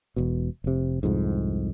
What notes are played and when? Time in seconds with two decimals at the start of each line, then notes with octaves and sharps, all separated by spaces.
0.16 E1 B2
0.64 F1 C3
1.03 C2 F2 G#2